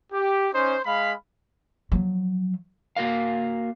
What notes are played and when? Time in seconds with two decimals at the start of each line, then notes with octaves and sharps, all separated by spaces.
0.13 G4
0.54 C#4 D#4 C5
0.85 G#3 F5 B5
1.92 F3 F#3
2.96 A#3 F#4 A#4 F5